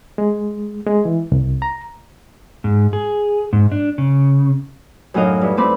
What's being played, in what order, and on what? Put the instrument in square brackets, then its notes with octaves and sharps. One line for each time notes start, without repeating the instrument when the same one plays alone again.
[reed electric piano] G#3
G#3
E3
C2
A#5
[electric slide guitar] G#2
G#4
G#2
D4
C#3
[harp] F#2 A2 D#4 F#4 D#5 F5
G2 E4
A3 C4 D#4 B4 D5